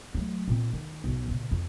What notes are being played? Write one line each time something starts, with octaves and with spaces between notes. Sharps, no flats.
F#3 A3
A#2 C4
D#3
B1 B2
A#2 C#3
F2